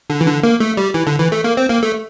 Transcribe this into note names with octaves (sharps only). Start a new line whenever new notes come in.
D3
E3
D3
A#3
A3
G3
E3
D3
E3
A3
A#3
C4
A#3
A3